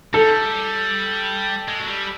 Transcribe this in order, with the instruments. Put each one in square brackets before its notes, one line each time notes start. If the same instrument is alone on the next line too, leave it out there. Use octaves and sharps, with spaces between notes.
[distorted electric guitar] G3 [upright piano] A4
[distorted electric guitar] G#3
F#3
G3